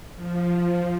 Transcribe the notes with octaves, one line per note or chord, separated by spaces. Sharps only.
F3